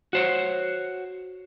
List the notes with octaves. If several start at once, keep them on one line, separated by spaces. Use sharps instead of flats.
F#4 C5 C#5